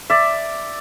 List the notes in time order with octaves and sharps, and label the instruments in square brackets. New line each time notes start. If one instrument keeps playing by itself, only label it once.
[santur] D5 E5